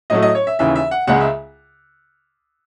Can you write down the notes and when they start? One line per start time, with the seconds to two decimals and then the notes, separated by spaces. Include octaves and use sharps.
0.10 A2 F#3 A3 D#5
0.22 D#5
0.35 C#5
0.47 E5
0.59 D#2 C#3 E3 E5
0.76 E5
0.91 F#5
1.07 C#2 C#3 G#3 F#5
1.20 E5